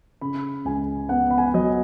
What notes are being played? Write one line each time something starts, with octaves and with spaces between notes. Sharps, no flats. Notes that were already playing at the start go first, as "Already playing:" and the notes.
C#3 B5
C#2 G#5
B3 F#5
B5
G#5
F#5
F#3 D#5